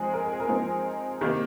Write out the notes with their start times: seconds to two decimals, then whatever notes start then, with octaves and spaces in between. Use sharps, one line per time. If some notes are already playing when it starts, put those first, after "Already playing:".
Already playing: F3 G#3 C4 D#4 G#4
0.13 A#4
0.26 G#4
0.40 A#4
0.48 F3 G#3 C4 D#4
1.21 C3 D#3 A#3